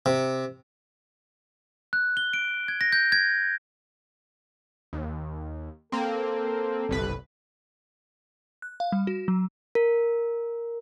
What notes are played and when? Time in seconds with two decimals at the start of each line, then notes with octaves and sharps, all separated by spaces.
0.06 C3
1.93 F#6
2.17 G7
2.33 D7
2.68 G#6
2.81 A#6
2.92 G6
3.12 G#6
4.93 D#2
5.92 A#3 C4 A4
6.89 G1 C2 B4
8.62 F#6
8.80 F5
8.92 G3
9.07 F#4
9.28 F#3
9.75 A#4